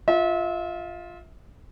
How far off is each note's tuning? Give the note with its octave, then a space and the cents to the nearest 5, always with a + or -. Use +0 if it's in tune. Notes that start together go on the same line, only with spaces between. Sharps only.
F4 +5 E5 -35